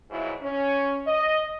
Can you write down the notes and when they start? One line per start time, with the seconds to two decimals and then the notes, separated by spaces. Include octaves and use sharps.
0.10 G#2 B2 F3 F#3 E4
0.41 C#4
1.06 D#5